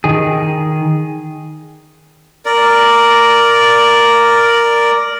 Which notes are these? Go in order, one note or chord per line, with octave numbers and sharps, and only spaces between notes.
D#3 G#4
A#4 D5